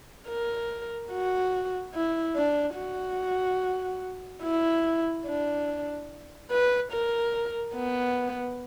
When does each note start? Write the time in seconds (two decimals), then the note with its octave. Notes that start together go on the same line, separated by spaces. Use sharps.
0.28 A#4
1.11 F#4
1.94 E4
2.36 D4
2.77 F#4
4.43 E4
5.26 D4
6.51 B4
6.92 A#4
7.76 B3